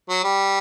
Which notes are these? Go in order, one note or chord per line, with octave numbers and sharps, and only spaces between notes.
F#3
G3